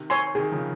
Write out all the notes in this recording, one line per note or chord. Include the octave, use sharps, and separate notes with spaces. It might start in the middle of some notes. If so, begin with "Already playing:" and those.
Already playing: C3 D#3
C#5 G#5 C6
C3 D#3 G#4
C#3 F3